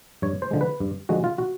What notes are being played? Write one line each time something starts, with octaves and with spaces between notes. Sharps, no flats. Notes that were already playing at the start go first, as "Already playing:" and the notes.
G2 C#5
C5
D3 F3 G#3
B4
G2
D3 F3 G#3 F#4
F4
F#4